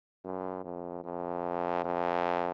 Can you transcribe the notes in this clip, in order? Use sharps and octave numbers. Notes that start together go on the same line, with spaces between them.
F#2
F2
F2
F2